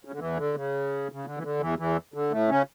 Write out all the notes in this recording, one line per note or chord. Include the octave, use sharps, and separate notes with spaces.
C#3
D3
E2 E3
D3
C#3
C#3
D3
E3
D3
E2 E3
E2 E3
D3
A2 A3
C#3 C#4